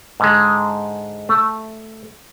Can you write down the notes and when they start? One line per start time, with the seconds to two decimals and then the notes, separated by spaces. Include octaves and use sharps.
0.20 G#2 D3 G#3
1.29 A3